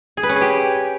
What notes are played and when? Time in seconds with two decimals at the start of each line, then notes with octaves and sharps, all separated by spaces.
0.17 G#4
0.23 B4
0.29 C#4
0.35 G#4
0.41 G4